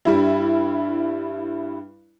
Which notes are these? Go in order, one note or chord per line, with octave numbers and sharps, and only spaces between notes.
G2 G3 E4